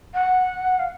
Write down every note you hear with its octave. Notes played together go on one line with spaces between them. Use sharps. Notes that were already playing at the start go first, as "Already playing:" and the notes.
F#5
F5